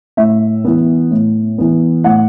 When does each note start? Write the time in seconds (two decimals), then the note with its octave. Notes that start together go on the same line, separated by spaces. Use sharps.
0.17 A2 E5
0.64 E3 B3
1.11 A2
1.58 E3 B3
2.04 A2 F#5